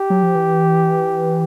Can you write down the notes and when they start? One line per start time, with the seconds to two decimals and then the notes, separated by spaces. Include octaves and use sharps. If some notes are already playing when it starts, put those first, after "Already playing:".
Already playing: G4
0.10 F#3
0.23 F3
0.35 E3